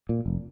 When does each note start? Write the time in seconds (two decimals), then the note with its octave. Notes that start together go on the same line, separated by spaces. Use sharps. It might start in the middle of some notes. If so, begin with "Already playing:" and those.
0.09 A#2
0.26 F1